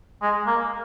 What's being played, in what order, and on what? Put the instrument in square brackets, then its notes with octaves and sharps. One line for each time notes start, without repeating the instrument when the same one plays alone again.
[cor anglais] G#3
A#3